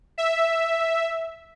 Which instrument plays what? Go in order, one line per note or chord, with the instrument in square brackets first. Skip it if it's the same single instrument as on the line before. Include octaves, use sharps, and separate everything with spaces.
[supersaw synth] E5